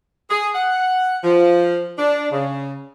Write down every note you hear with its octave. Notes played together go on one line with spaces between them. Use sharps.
G#4
F#5
F3
D4
C#3